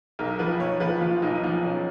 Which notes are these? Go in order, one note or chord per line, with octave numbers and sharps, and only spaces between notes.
B1 A#4
F3 B4
B1 C#5
F3 B4
F3 F4
B1 D#4
F3 D#4
B1 C#4